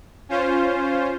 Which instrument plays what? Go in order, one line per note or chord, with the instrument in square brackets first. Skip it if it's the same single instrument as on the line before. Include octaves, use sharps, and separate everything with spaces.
[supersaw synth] C#4 F4 C5